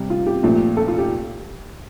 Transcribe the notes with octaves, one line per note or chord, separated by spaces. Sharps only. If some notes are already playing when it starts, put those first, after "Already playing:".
Already playing: C3 G3
F4
G4
A#2 F3 A3
A4
F4
G4